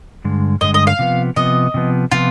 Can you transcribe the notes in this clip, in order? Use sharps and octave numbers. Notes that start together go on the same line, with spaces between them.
G2 D3 G#3
G2 D3 G#3 D#5
D#5
F5
C3 F3 B3
C3 F3 B3 D#5
C3 F3 B3
C3 F3 B3 F4